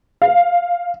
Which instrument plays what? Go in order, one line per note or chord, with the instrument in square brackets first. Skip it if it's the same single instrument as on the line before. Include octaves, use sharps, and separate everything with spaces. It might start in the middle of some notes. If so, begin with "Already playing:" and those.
[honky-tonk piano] F5